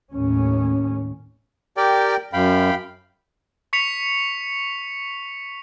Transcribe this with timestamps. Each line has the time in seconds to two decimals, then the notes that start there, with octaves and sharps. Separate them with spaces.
0.13 D#2 A2 C#4
1.77 G4 A#4 D5 G5
2.33 F#2 F5 G5 B5
3.73 C#6 B6 C#7 F7